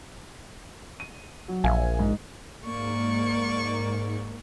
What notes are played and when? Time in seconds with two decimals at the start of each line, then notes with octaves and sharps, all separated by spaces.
1.00 D#7
1.48 F#3
1.64 A#1 E5 F5 G#5
1.99 G#2
2.65 G#2 A#3 D5 C#6